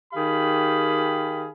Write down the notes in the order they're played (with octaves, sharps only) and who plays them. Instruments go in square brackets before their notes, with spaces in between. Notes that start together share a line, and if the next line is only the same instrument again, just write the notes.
[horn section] D#3 G4 G#4 F5 B5